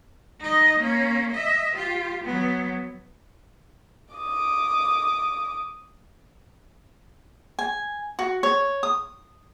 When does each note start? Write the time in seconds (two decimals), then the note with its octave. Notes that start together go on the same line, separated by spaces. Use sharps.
0.40 D#4 D#5
0.79 A#3 C#4
1.32 D#5 E5
1.75 F4 G4
2.24 F#3 B3
4.15 D6 D#6
7.59 G#5
8.19 F#4
8.43 C#5
8.83 D#6